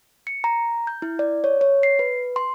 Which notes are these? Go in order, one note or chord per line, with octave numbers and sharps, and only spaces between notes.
C#7
A#5
G6
E4
D5
C#5
C#5
C7
B4
C6